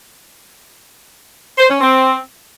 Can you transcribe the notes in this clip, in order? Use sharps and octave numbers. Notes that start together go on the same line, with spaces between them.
C5
C#4
C4